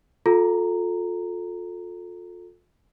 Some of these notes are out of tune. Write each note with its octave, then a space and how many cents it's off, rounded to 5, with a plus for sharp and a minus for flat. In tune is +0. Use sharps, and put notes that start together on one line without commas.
F4 +30 A4 +0 A#5 -10